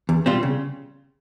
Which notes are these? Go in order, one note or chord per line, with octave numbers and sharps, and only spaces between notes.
E2
B2 G3 C4 F4
C#3